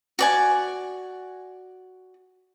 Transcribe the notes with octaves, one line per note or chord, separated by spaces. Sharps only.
F#4 D5 G#5